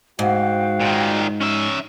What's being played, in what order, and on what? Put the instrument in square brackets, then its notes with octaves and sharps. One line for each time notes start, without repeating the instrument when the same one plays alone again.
[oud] G#2 [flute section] F#4 F5 G5
[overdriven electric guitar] A#2 D#3
C#4 E5